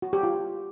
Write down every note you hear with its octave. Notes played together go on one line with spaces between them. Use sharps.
F#4
G4
F4